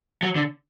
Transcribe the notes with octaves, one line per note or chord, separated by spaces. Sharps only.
F#3
D3